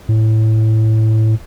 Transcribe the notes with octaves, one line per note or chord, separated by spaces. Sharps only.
A2